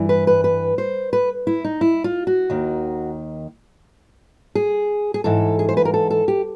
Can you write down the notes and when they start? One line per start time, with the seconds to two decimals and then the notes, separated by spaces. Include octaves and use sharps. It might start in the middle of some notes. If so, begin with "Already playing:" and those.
Already playing: G2 E3
0.09 B4
0.27 B4
0.44 B4
0.78 C5
1.13 B4
1.47 E4
1.64 D#4
1.81 E4
2.04 F4
2.27 F#4
2.50 D#2 D#3
4.55 G#4
5.14 G#4
5.24 G#2 E3 A4
5.59 G#4
5.69 C5
5.77 B4
5.85 A#4
5.94 A4
6.10 A4
6.28 G4